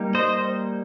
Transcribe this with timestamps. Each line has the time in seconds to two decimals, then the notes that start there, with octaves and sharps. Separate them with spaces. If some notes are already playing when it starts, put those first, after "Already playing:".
Already playing: G3 A#3 D#4
0.15 C5 D#5